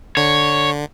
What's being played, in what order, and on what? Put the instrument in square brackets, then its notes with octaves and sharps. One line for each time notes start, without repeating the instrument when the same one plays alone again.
[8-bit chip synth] D3 [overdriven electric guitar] C#5